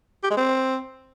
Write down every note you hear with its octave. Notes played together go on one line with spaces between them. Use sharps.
G4
G#3
C4